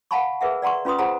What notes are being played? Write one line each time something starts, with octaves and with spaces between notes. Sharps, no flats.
F5 F#5 G#5 A5 B5 C#6
G#4 A#4 B4 E5 F#5
D5 F#5 A#5 C6 C#6
C#4 F4 B4 C6 D#6
F4 G#4 C5 F#5 G#5 A#5